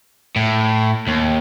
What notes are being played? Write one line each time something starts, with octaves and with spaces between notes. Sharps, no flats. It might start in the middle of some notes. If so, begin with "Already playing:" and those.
A2
D#2